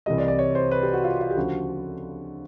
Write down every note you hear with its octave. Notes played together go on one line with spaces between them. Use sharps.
C2 C3 E3 G3 D#5
D5
D5
C#5
C5
B4
G4
F#4
F4
F4
G4
D2 C#3 F3 F#4